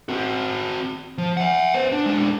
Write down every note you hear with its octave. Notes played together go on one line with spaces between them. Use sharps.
C4 F#4
F3
E5 F#5
B3 C5
D4
G#3 D4